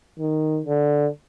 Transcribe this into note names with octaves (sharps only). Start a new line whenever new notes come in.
D#3
D3